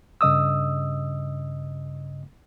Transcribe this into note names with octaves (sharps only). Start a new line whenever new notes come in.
G2 C#3 D#5 D#6 E6